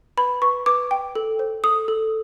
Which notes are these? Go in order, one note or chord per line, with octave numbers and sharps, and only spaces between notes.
B4 B5
B4 C#6
B4 D6
G5
A4
C5
A4 D#6
A4